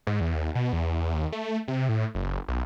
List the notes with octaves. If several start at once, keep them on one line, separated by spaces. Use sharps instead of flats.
G#2
E2
D#2
B2
E2
D#2
A3
C3
A2
F#1
B1